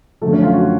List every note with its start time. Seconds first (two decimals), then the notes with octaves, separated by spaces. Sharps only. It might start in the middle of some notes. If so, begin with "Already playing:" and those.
0.22 F#2 D3 F3 A3 A4
0.33 C#4 C#5
0.43 F4 F5
0.54 F#4